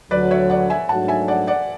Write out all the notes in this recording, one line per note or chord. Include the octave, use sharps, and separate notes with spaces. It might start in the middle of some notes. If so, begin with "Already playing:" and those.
D2 D3 F#3 B4 D5
C#5 E5
D5 F#5
E5 G#5
G#2 F#3 A3 D4 F#4 F#5 A5
E5 G#5
D5 F#5
D5 F#5